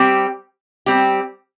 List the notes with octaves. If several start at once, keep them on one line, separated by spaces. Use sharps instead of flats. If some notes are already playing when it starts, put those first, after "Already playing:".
Already playing: G3 C4 G4
G3 C4 G4